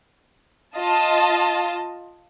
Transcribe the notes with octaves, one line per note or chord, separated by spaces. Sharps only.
F4 D#5 A5